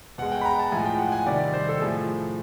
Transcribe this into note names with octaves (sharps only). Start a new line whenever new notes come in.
B2 G#3 F#5
G5
B5
A#5
A5
A2 F3 G#3 G#5
G5
F#5
G#5
C3 D#3 G3 D5
C5
A4
A2 F3 A3 G#4